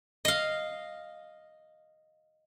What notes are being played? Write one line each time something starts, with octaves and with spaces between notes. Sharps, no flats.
D#5 F5